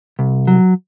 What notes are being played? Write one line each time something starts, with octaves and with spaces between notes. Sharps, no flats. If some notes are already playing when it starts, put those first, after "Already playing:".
C2
F#3